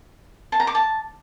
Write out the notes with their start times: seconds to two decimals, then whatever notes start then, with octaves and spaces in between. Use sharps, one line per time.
0.52 A5
0.60 A#5
0.67 D6
0.75 A5